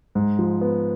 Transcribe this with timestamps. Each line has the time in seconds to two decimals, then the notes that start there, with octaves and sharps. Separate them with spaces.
0.15 G#2
0.39 F3
0.61 B3